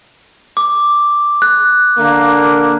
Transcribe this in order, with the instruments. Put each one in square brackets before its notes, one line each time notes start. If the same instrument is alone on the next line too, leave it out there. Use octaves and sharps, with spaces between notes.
[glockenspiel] D6
F#6
[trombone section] D3 A#3